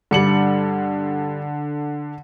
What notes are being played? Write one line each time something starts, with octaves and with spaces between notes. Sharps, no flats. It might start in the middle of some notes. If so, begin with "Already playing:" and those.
G2 D3 G3 C#7 F#7